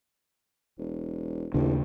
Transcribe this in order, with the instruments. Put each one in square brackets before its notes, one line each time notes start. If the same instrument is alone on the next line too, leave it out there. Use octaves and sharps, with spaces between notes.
[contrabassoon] E1
[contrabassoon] A1 [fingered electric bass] D#2 C#3 D4